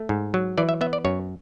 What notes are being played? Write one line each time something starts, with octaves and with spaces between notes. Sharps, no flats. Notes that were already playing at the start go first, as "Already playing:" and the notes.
Already playing: A3
G#2
F#3
E3 D5
E5
B3 E5
D5
F#2 C#5